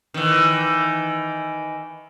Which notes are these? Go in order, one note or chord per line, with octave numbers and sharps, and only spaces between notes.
D#3 E3